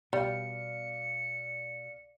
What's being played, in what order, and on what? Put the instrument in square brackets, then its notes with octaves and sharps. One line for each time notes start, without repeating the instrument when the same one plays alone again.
[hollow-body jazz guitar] B2 [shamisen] G3 [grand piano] D5 F5 [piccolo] C#7